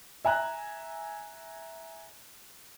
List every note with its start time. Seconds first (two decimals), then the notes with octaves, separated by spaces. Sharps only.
0.25 E5 G#5 A#5 F#6